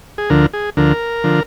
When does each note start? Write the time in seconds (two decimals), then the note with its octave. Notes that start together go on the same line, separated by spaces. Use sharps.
0.18 G#4
0.30 D2 D3 F3 A#4
0.53 G#4
0.77 D2 D3 F3 A#4
1.24 D3 F3